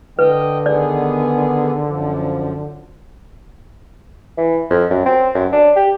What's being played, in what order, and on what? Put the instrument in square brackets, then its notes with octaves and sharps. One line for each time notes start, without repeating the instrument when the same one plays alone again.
[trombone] D3 [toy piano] B4 [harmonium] D#5 G5
[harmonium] D#3 B3 G#4 [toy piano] D5
[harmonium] F#2 F3
[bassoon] E3
F2
F#2
C4
F#2
D4
G4